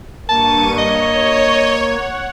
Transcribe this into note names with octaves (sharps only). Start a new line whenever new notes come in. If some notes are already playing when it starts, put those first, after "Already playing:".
G2 A#3 A5 C#6 D#7
C#5 D#5
F#5